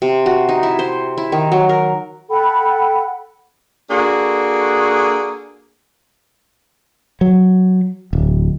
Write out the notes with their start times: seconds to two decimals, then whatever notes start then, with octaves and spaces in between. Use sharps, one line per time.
0.02 C3
0.26 F#4
0.49 D#4
0.63 E4
0.79 C5
1.17 E4
1.32 D#3
1.52 F#3
1.69 A#4
2.30 A4 F#5 G5 B5
3.90 A#3 D4 F#4 G#4 A4
7.21 F#3
8.13 D1